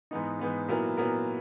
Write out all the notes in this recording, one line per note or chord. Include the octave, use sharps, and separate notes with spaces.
G#2 E3 B3 D#4
G#2 E3 B3 D#4
A#2 F#3 B3 E4 A#4
A#2 F#3 B3 E4 A#4